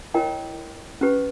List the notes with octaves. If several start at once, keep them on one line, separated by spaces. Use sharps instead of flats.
E4 A#4 C#5 D#5 G5
C#4 G4 B4